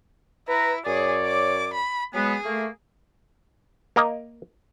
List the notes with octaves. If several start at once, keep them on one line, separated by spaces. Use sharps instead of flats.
E4 B4 A#5
F#2 G#4 C#5 D5
D6
B5
F#3 G#3 B3 G#4
A3 A#3
A#3 A#4 D#5